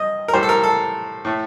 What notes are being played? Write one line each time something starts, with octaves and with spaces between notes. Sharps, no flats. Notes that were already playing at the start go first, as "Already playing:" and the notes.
Already playing: G2 D#5
A#4
A2 G3 C5
A4
A#4
A4
A2 A3